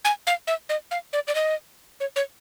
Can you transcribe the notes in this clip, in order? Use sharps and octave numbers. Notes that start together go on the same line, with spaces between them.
G#5
F5
E5
D#5
F5
D5
D5
D#5
C#5
C#5